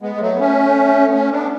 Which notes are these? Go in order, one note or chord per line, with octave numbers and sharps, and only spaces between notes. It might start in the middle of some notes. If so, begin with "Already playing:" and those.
G#3 B3
G#3
F#3 A3
B3
A3 C#4
B3
A3 C#4
B3 D4